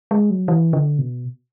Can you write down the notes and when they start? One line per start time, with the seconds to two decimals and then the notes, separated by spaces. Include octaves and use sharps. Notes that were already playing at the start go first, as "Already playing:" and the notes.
0.11 G#3
0.30 F#3
0.48 E3
0.73 D3
0.98 B2